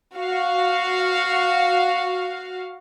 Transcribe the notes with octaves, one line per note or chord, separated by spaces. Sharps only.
F#4 F5